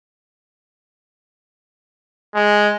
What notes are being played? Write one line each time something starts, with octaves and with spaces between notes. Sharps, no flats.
G#3